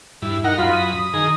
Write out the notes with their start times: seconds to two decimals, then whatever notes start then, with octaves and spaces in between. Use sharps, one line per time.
0.22 G2 E4
0.44 D#4 A#4 F#5
0.58 F#2 F4 B5
0.73 D#6
0.98 D#6
1.14 D#3 G#4 A#5